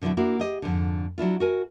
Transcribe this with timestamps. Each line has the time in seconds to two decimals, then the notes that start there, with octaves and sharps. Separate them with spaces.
0.02 B2 D3 F#3 C4 E4
0.17 A#3 D4 E4 F#4
0.39 G4 G#4 D#5
0.62 F2 G#2 D3
1.18 F#3 D4 E4 F4
1.40 F#4 A#4 G#5